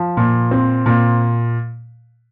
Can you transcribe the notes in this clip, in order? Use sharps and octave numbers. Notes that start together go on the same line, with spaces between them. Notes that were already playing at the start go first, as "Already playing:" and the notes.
Already playing: F3
A#2
C4
A#2